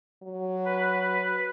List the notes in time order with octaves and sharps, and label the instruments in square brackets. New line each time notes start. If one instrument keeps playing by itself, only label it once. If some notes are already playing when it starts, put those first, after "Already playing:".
[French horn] F#3
[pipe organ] B4